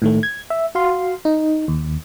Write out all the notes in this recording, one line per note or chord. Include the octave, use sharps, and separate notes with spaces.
A2 D#3 A3
G#6
E5
F#4 F5 C6
D#4
D#2